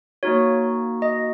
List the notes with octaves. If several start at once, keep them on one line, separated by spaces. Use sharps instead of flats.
A#3 D#4 F#4 C#5
D#5